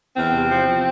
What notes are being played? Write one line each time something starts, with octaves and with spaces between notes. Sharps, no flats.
E2 C4
C3
F3
F3